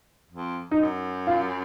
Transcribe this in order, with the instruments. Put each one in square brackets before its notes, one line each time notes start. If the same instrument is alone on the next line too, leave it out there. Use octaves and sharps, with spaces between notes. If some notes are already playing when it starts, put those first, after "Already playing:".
[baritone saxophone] F2
[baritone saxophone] F#2 [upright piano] D#4
[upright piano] F4